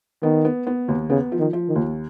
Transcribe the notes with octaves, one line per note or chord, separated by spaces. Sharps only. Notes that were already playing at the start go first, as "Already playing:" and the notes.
D#3 B3
B3
B3
D#2
C#3 B3
F3
D#3
F3
D#3
D#2